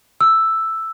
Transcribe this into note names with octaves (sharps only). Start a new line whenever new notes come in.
E6